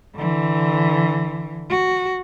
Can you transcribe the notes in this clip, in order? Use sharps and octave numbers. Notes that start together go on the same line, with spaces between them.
D3 E3
F#4